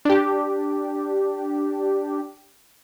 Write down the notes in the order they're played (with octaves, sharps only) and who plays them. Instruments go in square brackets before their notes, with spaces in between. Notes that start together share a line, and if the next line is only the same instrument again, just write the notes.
[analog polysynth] D4 G4